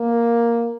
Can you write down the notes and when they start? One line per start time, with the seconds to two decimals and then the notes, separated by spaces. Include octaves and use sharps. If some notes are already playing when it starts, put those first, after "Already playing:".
Already playing: A#3